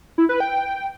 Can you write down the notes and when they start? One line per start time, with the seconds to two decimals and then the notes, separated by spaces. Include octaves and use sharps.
0.18 E4
0.29 B4
0.40 G5